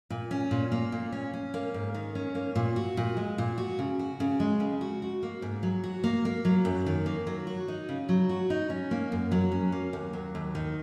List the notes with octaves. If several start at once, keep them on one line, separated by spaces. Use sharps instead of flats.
A#2
C#4
A#2
A#3
A#2
C#4
C#4
A#3
G#2
D#3
C#4
A#3
A#2
F#4
A#2
G#3
A#2
F#4
C#3
F#4
C#3
G#3
C#3
F#4
F#4
A#3
G#2
F#3
F#4
A#3
A#3
F#3
F#2
D#3
A#3
F#3
F#4
D#4
C#3
F#3
F#4
D#4
C#4
A#3
F#2
F#3
C#4
A#3
D#2
F#3
D#2
D#3